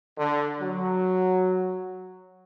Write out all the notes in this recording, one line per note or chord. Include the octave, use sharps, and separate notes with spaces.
D3
F#3